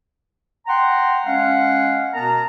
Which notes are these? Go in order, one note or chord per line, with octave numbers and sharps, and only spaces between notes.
F#5 G5 A#5 C6
G#3 C#4 F5 F#5
B2 B3 A#4 A5 A#5